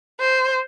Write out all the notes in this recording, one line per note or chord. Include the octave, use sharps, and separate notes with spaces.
C5